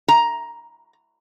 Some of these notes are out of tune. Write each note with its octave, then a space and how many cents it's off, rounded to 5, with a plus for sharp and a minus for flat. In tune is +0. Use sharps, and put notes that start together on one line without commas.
A#5 +10